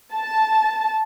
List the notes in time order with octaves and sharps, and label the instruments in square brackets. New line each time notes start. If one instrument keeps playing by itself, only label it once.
[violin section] A5